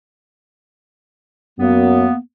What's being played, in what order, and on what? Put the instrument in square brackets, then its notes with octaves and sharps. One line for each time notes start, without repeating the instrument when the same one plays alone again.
[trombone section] F#2 [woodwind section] A#3 B3